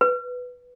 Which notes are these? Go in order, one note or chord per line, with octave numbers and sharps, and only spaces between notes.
B4